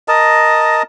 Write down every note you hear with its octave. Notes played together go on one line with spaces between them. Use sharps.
A#4 D#5 A5